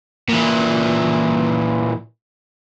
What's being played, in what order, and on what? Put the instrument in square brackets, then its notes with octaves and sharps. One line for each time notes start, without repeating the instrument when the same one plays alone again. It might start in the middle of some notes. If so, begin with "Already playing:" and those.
[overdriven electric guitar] A#2 E3